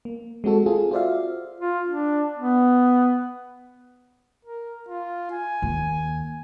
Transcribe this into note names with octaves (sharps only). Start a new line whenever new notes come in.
A#3
G#3 C4 F#4 A4
C4 F4 G#4 A4
F4 F#4 C5 D5 E5 F5
F4
D4
B3
A#4
F4
G#5
D#2